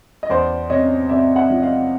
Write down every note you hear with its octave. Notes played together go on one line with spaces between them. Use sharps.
D#5
E2 C5 D5
C3 C#5 D#5
C3 D5 E5
E5 F#5
F3
D#5 F5